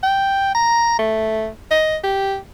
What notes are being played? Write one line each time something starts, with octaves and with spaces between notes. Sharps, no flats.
G5
A#5
A3
D#5
G4